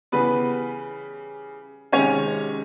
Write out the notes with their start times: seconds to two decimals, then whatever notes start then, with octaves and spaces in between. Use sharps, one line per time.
0.12 C#3 E3 G3 B3 B4
1.92 C3 D#3 G#3 C#4 C#5